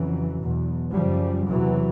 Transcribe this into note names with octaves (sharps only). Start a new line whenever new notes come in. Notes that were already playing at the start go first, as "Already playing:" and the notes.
Already playing: F2 C#3 E3 F#3
E2 B2
F#2 C#3 F3 G3
E2 C3 E3 F#3